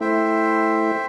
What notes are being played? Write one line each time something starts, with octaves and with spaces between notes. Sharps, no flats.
A3 E4 C5 E5 G5